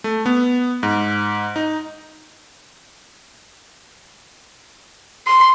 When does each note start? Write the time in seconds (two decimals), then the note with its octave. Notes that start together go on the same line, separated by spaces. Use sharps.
0.04 A3
0.26 B3
0.83 G#2
1.56 D#4
5.27 C6